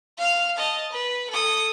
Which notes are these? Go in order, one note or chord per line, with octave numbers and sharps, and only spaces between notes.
F5 F7
D#5 A5
B4
A4 D#6